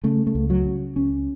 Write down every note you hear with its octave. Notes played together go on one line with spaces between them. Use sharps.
C#3 A3
A3
C#2
F#3
C#3
C#2 C#4